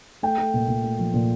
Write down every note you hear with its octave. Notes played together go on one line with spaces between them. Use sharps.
A3 G5
A3
A#2
A#2
A3
F3
A#2